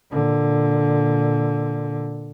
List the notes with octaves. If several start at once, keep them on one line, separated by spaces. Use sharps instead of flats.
A#2 D3